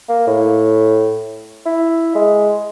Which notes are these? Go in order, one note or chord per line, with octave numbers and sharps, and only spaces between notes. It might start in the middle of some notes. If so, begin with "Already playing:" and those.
A#3
A2
E4
G#3